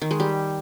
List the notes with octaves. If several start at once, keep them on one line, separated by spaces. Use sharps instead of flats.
D#3
G#3
G3